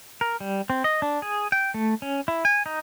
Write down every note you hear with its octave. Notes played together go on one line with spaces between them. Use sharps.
A#4
G3
C4
D#5
D4
G#4
G5
A3
C#4
E4
G#5
D#4